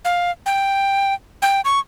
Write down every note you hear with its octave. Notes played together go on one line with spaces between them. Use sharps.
F5
G5
G5
C#6